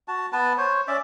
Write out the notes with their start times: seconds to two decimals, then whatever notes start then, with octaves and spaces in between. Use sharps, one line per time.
0.08 F#4 A5
0.32 B3 B4 A5
0.58 C5 C#5
0.88 C#4 D5 E5